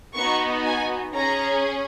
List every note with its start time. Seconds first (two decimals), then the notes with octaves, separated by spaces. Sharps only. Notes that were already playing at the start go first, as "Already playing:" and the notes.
0.14 B3 D#4 F#4 C#6
0.64 G#5
1.13 C#4 G#4 A#5